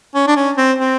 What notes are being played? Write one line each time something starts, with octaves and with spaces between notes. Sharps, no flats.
C#4
D4
C#4
C4
C4